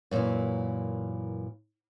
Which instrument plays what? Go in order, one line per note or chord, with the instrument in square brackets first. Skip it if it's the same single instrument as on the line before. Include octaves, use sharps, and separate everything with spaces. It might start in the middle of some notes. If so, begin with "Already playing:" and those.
[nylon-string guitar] F#2 A#2 E3